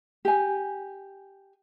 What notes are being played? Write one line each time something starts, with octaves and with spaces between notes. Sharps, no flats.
G4 G#5